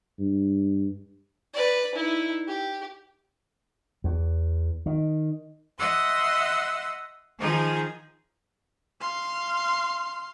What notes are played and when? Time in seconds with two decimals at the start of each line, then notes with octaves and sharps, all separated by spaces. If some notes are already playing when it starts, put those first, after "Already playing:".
0.19 G2
1.53 B4 D5
1.95 D#4 E4
2.48 G4
4.04 E2
4.86 D#3
5.79 D#5 E5 F#5 C6 E6
7.38 D#3 F3 D#4 G#4
9.01 F5 C6